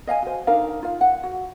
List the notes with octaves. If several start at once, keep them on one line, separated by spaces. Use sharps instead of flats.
D#5 F5 F#5 G#5
F#4 C5
D4 D#4 A#4 F5
F4 F5
F#5
F#4